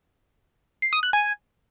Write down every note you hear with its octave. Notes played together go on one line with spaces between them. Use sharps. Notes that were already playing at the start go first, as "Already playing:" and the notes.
C7
D#6
F#6
G#5